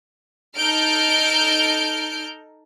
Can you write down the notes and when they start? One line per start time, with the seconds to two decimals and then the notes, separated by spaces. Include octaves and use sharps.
0.57 D#4 A4 F6 G6 D7